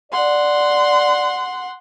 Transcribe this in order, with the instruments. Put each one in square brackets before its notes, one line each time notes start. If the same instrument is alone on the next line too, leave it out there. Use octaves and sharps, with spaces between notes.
[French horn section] D5 [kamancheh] F#5 C6